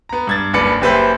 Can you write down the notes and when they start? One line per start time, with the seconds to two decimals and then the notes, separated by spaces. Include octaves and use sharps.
0.09 B3 A#5
0.27 G2 G#6 A6
0.53 F#1 G2 B4 D5 C#7
0.81 F#1 G4 B4 C5 E5 G6